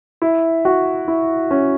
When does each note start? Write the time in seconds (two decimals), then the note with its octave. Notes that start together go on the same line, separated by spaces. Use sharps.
0.22 E4
0.65 F#4
1.08 E4
1.51 C#4